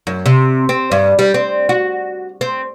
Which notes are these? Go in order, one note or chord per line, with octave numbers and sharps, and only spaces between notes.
F#2
C3
C4
G2
G3
C4
F#4
C4